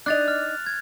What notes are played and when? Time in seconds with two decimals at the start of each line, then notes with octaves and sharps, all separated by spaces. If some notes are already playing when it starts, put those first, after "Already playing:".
0.06 D4 D#4 D#5 F#6 A6 F7
0.28 F6
0.66 G#6